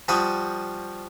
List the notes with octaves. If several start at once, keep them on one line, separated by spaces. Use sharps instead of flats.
F3 G3 F#4 F#5 B5 D#6